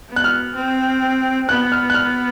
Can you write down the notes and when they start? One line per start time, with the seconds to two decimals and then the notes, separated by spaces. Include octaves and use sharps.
0.09 B3
0.16 F#6
0.24 F6
0.55 C4
1.49 B3 F#6
1.72 F6
1.90 F#6
1.94 F6